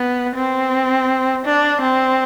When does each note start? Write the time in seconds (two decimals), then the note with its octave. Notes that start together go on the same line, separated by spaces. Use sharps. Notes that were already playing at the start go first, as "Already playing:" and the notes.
Already playing: B3
0.35 C4
1.45 D4
1.81 C4